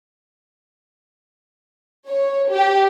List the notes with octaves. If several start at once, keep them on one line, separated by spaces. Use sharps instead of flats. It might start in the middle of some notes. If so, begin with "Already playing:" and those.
C#5
G4